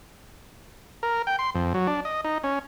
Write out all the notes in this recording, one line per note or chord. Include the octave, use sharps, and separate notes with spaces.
A#4
G5
C6
F2
F#3
D4
D#5
D#4
C#4